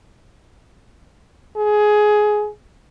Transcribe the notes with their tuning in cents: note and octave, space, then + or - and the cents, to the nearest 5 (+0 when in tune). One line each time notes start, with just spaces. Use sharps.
G#4 +15